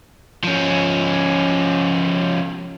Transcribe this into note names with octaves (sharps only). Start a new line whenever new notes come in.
F3 C#4